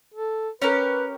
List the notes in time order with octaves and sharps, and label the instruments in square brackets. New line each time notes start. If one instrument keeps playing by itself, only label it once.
[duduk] A4
[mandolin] C#4 G4 A#4 [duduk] B4 [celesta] C#5